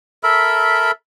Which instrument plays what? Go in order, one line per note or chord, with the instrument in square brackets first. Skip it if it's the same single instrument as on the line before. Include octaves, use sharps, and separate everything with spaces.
[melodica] A4 A#4 E5 B5